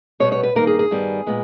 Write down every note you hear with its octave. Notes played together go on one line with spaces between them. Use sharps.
B2 G3 B3 C#5
C#5
B4
G2 D#3 A#3 A#4
G#4
G#4
G2 D#3 G3 B3
A#2 G#3 B3